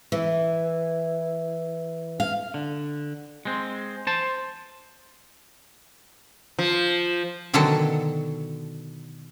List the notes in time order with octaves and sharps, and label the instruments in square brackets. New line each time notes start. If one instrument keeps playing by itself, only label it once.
[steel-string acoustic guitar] E3
F5
[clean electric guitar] D3
G#3 C4
C5 A5
[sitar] F3
[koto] B2 D3 D#3 F#3 A4 A5